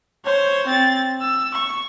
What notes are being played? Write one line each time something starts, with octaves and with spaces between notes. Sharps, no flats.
C5 C#5
C4 A6
E6
C#6